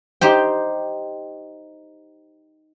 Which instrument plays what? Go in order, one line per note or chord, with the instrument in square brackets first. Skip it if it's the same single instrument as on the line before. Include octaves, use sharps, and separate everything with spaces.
[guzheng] D#4 G4 C5 G5